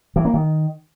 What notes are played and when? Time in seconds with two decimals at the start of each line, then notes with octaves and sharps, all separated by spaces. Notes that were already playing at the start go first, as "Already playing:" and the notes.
0.16 E3
0.25 A#3
0.34 D#3